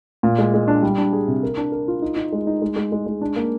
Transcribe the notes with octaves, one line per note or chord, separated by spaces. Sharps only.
A#2
G#3
G#3
D4
G3
D4
G#4
C3
A#4
D4
A#4
F4
D#4
D#4
G#3
D#4
G#3
G#3
G#3
G#3
D4
A#3